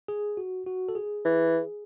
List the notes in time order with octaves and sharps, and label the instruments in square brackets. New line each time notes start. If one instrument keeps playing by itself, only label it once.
[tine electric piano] G#4
F#4
F#4
A4
G#4
[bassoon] E3